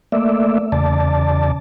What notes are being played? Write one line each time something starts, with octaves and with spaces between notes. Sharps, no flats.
A3 A#3 D5 E5
E2 C#3 D5 A5